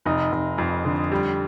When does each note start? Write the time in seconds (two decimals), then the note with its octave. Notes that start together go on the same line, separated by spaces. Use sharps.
0.06 F1 D#4
0.32 F1
0.58 F2
0.85 D3
1.12 G3